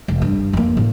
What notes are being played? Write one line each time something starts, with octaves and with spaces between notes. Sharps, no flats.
F1
G2
F2 A#3
A2